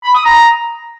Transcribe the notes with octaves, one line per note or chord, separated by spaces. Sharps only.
B5
D#6
A#5